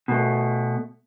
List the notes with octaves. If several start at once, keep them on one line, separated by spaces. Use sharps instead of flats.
B2 A3